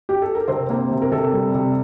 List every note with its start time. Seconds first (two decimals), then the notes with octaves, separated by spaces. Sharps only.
0.09 G4
0.22 A4
0.35 A#4
0.48 C3 C4 C5
0.69 A#3 C4 A#4
0.91 C3
1.02 A#4
1.12 C3 A4
1.33 G3
1.54 C3